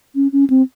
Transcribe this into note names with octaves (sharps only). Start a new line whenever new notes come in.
C#4
C#4
C4